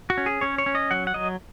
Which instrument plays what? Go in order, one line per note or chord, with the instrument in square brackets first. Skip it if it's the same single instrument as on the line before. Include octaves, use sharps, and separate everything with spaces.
[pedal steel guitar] F#4
C#4
G#4
C#4 C#5
C#5
C#4
D#5
F#3 F#5
F#5
F#3 D#5